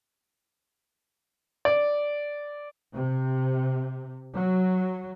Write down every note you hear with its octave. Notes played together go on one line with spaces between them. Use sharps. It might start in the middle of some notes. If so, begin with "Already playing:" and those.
D5
C3
F#3